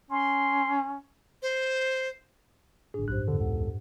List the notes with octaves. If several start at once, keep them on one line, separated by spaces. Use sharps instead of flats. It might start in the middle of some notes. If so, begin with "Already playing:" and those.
C#4 C6
C5
G1 A2 D4 G#4
B1 G2 G4 C5 F#6
E2 D3 A4
C#2 F#5